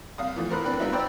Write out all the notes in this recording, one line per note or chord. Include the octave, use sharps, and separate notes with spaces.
C2 F5 D#6
E3 F3 A3
A#4 C5 B5 F#6
B3 C4 D4 B4
G3 B3 C4 D#4 F4 E5
C5 D5 G5 A#5 B5 E6